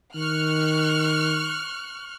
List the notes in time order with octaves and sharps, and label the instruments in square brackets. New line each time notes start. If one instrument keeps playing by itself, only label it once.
[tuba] D#3 [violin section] C#6 F6 F#6